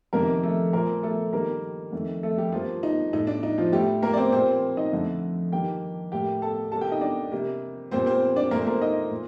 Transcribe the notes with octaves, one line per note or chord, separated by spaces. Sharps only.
F2 C3 D#3 A#3 A#4
A3 A4
A#2 F3 A3 A#3 A#4
A3 A4
G2 D#3 G3 A#3 A#4
F2 D#3 A3
A3 A4
G3 G4
G2 F3 A#3 F4
D#4
A2 A3 D#4
D4
D#4
F3 F4
A2 G3 A3 G4
A#3 A#4
D5
C4 C5
A#2 G3 A#3 C4 C5
D#4 D#5
F2 D3 A3
G2 D#3 A#3 G4 G5
A2 G3 A#3 G4 G5
A4 A5
C3 G3 A#3 A4 A5
G4 G5
D#4 D#5
D4 D5
C3 G3 A#3
A#2 G3 A#3 C4 C5
C4 C5
D4 D5
A#2 A3 A#3 A#4
C5
A#3 A#4
D#4 D#5
A#2